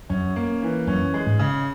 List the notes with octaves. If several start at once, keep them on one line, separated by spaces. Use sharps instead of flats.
F#2 C#4
A#3
E3
F#2 C#4
G#3
G#2
C#3